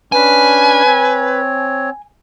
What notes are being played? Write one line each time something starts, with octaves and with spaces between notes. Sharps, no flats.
C#4 D4 B4 G#5
C4 C#5